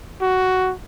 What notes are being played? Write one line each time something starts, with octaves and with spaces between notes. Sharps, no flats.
F#4